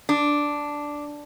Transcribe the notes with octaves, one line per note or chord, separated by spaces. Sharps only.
D4